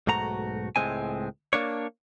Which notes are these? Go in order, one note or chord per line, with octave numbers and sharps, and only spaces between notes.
B1 G#2 A3 F#4 A#5
C#2 A2 C#3 G#3 C4 G#5
A#3 D4 C#5